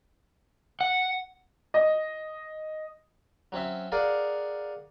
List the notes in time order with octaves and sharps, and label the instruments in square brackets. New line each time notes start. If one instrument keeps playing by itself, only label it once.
[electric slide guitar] F#5
[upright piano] D#5
[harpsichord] F#3 C4 C#4 E5
G#4 A#4 D5 F5 F#5